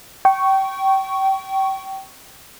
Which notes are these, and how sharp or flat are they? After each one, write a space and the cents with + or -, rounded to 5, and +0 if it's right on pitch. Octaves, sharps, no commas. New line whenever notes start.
G5 -25 C#6 +0